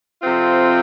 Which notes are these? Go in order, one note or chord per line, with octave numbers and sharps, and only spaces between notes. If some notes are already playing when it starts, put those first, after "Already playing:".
F2 C3 F3 C4 F4